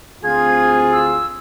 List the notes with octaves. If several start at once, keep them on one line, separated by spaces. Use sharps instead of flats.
D2 C4 F4 G#4 G#6
E6